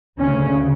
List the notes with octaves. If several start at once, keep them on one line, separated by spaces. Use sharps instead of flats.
D2 C#3 C#4